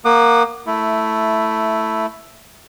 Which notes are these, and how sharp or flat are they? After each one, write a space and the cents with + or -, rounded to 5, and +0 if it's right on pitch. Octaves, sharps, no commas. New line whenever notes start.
A#3 +0 F#5 +0 D#6 -45
A3 +5 E4 +0